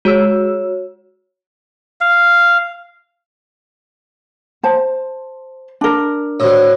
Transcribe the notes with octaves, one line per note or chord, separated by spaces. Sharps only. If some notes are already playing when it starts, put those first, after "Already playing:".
G#3 F#4 C#5 E6
F5
C5 A5
D4 A#4
D2 A2